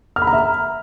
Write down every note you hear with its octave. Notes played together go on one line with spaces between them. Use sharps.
F6
B5
A#5
E5